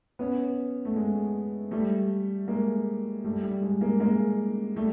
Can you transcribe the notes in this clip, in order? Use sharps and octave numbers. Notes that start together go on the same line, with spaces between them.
B3 C#4
A3
G#3
G3 A3
G#3 A#3
G3 A3
G3
G#3
G#3 A#3
G#3 A#3
G3 A3